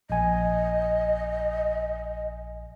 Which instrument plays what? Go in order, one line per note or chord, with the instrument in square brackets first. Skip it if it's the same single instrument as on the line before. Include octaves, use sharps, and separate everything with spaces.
[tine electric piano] A#1 G#5 [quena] D#5